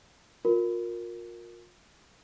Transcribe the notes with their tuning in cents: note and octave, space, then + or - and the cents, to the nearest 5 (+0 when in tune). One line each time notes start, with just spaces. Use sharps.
F4 +35 A#4 +0